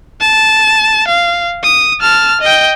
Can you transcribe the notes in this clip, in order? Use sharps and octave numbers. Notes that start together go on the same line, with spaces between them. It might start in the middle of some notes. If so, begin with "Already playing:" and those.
A5
F5
D#6
A5 F6
D#5 G5